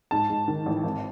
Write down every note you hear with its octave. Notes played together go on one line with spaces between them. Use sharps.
G#2 A5
G#2
D#3
A1
G#1